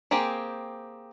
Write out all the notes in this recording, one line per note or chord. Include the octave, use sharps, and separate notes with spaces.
A#3 C4 G4 G#4